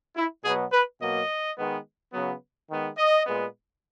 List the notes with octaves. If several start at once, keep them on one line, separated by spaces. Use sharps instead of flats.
E4
B2 F#3 B3 G#4
B4
B2 F#3 A#3 D#5
D#3 G#3 B3
C#3 F#3 B3
D#3 G#3 B3
D#5
A#2 G#3 B3